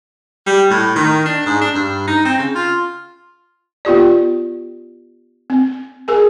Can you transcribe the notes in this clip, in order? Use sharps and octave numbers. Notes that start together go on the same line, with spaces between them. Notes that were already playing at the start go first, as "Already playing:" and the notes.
G3
A2
D#3
D4
G#2
D4
G2
D#4
C4
C#3
F4
B3 F4 G4 D5
C4
G#4 A#4 G#5